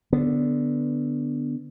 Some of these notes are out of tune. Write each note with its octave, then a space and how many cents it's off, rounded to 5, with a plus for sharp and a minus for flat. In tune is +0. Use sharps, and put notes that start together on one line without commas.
D3 +0 B3 +0